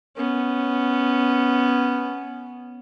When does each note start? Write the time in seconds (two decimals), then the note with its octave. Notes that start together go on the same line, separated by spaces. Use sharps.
0.17 B3 C#4